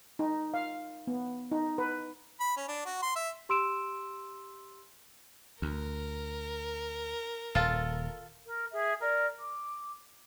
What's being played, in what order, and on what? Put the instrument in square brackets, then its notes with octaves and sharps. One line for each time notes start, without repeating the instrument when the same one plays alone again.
[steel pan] D#4
F5
B3
D#4
B4
[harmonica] B5
C#4
D4
F#4
C6
E5
[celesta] G4 C6 E6 D7 E7
[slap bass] D2 [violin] A#4
[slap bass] D#1 [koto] F4 A4
[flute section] A#4
G#4 E5
A#4 D5
D6